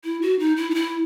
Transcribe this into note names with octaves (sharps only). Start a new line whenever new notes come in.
E4
F#4
D#4
E4
D#4
E4